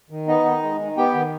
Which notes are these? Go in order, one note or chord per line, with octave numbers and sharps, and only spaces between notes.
D#3
B3 D#4 D#5
D#3
G#3
D#3
B3 G4 G5
D#3